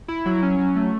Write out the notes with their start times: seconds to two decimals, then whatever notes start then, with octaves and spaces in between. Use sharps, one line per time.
0.08 E4
0.26 F#3
0.42 C#4
0.58 F#3
0.76 A3